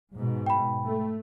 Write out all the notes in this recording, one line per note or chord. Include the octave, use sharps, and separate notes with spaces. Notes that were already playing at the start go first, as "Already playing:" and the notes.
G#2 B2
G5 B5
A3